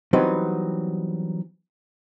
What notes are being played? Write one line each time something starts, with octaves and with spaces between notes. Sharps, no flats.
E3 F#3 G3 B3 C4 D#4